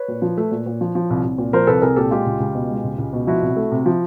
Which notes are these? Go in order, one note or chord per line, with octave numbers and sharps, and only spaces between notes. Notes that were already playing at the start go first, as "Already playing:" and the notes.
Already playing: B4 C#5
A#2
F3
A3
A#2
A#2
F3
F3
C2
C2
A#2
F3 A#4 C5
C2 A4 B4
C2 G#4 A#4
A#2 G4 A4
G#3 F4 G4
C#2
C#2
B2
G#3
C#2
C#2
B2
F3 E4 F#4
C2
A3
C3
F3